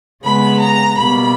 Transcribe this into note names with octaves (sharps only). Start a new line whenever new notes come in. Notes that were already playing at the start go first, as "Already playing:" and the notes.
C#3 G#3 B3 B5
A#5
B2 G3 A#3 B5